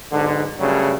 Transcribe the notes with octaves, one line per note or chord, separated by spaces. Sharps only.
B1 G#2 D3
G2 C#3 F#3 G3 A3